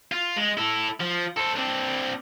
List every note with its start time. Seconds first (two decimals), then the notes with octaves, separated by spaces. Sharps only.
0.12 F4
0.36 G#3
0.57 E4 A4
1.00 F3
1.37 A4 C5
1.57 C4 D4